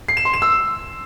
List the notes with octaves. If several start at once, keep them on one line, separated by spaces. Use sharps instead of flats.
C7
E7
C6
E7
E6